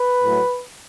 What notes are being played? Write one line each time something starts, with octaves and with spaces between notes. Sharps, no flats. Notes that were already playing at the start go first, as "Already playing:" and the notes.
Already playing: B4
A2 F#3 A3